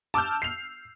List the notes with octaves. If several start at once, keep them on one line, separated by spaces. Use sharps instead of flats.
A5 D6 E6 F6 G6
C7 F7